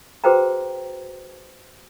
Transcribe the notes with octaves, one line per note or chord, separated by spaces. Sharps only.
F#4 G#4 B4 C5 G5 A#5